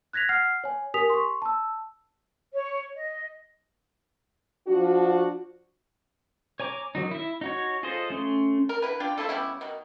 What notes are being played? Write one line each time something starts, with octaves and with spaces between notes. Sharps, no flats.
F#6 G#6 A#6 B6 F7
F#5 F6 C7
C#5 G#5
G4 A#4 G#5 D#6 B6 F7
C6 C#6
A5 E6
C#5
D#5
F3 D4 F4 F#4
C#5 G#5 A#5 D6
D#3 F#3 D#4
E4 E5
D#4 F#4 C#5
F4 G#4 A4 C5 D#5
A3 C#4 C6
A#4
D3 E4 B4
D4 F4 G4
A3 E4 F4 A4
G3 B3 C#4 E4
B2 D#3